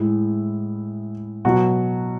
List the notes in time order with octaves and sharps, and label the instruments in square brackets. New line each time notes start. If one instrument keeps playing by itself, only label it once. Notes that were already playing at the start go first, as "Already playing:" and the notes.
Already playing: [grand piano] A2 G#3 E4
B2 F#3 F#4